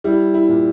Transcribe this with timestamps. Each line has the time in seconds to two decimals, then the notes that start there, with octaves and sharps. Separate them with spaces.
0.04 G3 E4
0.34 E4
0.49 A#2